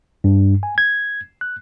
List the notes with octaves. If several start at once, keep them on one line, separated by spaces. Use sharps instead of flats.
G2
G#5
G#6
F#6